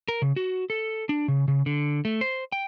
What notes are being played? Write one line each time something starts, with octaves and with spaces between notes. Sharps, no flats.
A#4
C#3
F#4
A4
D4
C#3
C#3
D3
A3
C5
G5